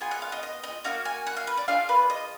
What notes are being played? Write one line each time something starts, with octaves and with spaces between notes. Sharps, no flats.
B3 F4 G#4 G#5
F#5
F5
D#5
D#5
D#5
A#3 D#4 F#4 F5
G#5
F#5
F5
B4
D5
D4 F4 G#4 F5
B4
D#5